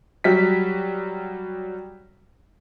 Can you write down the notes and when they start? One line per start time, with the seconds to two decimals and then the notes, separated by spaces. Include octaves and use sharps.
0.24 F#3 G3 B6